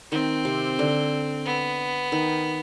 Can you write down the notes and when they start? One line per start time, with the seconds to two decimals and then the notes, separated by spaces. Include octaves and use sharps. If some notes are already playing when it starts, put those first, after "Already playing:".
0.12 D#3 C4
0.45 C3
0.79 D3
1.45 B3
2.12 D#3